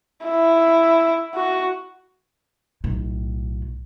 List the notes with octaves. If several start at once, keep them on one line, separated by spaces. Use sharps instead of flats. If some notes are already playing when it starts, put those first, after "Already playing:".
E4
F#4
B1 A2